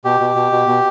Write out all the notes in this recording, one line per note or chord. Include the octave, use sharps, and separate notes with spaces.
B2 G4
B2
B2
B2
B2